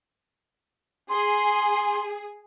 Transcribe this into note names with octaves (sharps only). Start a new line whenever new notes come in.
G#4 C6